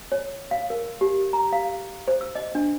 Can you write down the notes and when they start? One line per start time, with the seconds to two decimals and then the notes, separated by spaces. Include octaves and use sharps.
0.12 C#5
0.51 F5
0.70 A#4
1.01 G4
1.33 A#5
1.53 F5
2.08 C5
2.21 E6
2.35 D#5
2.55 D4